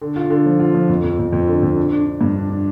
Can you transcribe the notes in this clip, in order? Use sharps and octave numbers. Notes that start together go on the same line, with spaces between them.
D3
F4
D3
F3
F4
F3
F2
F2
F2
F2
D3
F2
D4
D4
D4
G2
D4
D4